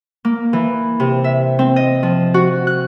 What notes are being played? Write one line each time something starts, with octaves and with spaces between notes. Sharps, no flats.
A#3
E3
C3
E5
C4
D#5
F3
F#4
F#6